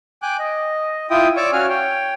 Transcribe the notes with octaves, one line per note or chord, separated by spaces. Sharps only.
G5 G#5 D6 F#6
D#5
E4 F4 E5 G5 D#6
C#5 D5 C#6 D6 E6
C#4 F#4 C#5 F5 G#5 F6
C#5 G5